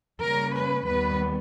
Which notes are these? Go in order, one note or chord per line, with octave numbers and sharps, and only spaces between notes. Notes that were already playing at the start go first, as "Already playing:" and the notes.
C#3 G3 A#3 C#4 A#4
B4
D#2 D#3 G3 B3 B4